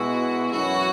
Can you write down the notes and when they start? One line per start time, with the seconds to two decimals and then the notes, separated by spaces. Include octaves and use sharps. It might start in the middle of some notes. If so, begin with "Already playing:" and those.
Already playing: B2 G#3 E4 F#4
0.51 F#2 E3 C#4 E4 F#4